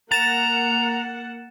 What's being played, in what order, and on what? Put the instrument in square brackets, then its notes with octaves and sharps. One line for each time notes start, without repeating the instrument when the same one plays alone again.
[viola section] A#3 F#5 [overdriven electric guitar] A#5 [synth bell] A6 E7